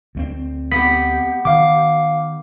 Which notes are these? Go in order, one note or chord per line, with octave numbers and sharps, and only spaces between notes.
D2 A3 C4
B3 G4 B6
D#3 F5 D6